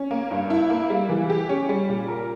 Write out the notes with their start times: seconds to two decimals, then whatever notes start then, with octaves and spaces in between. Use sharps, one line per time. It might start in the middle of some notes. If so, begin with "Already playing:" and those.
Already playing: C#4
0.11 A#3
0.31 G2
0.50 E4
0.70 A#3
0.90 G3
1.09 E3
1.30 G4
1.49 C#4
1.69 G3
1.89 A#2
2.08 A#4